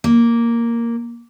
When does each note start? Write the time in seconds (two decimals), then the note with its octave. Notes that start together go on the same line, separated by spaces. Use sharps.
0.04 A#3